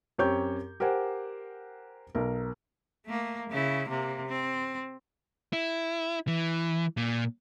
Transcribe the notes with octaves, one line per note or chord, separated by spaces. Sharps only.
F#2 C4 G4 C#5 C#6 G6
G4 A#4 C5 F#5 G#5
B1 A#4
A3 A#3
C#3 E4
C3 A#3
C4
E4
E3
A#2